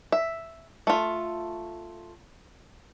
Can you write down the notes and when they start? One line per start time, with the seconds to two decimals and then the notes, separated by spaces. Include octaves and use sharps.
0.12 E5
0.87 A3 F4